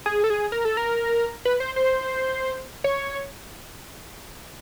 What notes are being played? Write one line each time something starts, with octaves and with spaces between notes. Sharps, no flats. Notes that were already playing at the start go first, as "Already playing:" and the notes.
G#4
A4
G#4
A#4
A4
A#4
B4
C5
C5
C#5